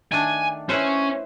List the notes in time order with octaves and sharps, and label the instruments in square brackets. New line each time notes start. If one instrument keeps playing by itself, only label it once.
[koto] D#3 A3 D4 [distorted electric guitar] G#5
[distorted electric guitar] C#4 [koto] E4 B4 C5